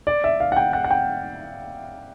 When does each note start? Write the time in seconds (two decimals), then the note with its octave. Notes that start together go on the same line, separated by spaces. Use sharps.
0.07 D5
0.24 E5
0.40 F5
0.52 F#5
0.57 G5
0.73 F#5
0.84 F#5
0.91 G5